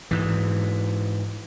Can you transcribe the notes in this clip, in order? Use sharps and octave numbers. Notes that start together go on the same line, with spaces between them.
G#2 E3